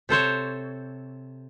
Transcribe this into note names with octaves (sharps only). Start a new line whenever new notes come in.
C3 A4 C5 C#5